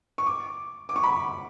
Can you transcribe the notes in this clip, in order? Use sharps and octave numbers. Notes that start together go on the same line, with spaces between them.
C#6
D6
D6
C#6
B5